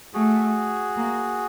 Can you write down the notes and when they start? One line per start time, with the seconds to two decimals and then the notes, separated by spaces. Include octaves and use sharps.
0.14 A3 F#4 G#4
0.96 A#3